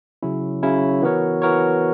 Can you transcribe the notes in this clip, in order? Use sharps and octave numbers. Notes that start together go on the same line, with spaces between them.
C#3 F#3 C#4 E4
C#3 F#3 C#4 E4
E3 B3 F#4 A#4 C#5
E3 B3 F#4 A#4 C#5